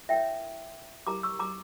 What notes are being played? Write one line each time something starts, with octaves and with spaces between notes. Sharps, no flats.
E4 A#4 C#5 E5 G5
E4 G4 A#4 A#5 D6
C#6 E6
A#5 D6